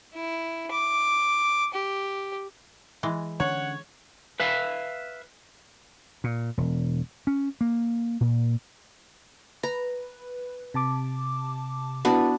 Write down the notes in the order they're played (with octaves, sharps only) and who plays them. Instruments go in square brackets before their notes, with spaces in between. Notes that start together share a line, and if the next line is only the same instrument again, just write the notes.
[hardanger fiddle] E4
D6
G4
[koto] E3 G#3
[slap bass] D3 C#4 [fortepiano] C#5 [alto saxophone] F#5
[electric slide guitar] B4 E5 F5
[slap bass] A#2
E1
C#4
A#3
A#2
[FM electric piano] B4 [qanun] A#5
[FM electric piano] C3 A5 D6
[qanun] B3 D4 F#4 [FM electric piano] E4 B4